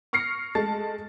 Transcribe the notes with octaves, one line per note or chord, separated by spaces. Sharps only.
C#6 F6 A#6 C7 C#7
G#3 A3 A5 A6